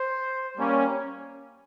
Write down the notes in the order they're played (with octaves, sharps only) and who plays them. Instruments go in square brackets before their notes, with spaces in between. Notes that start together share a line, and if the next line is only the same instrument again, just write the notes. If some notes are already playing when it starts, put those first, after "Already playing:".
Already playing: [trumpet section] C5
G3 A#3 C#4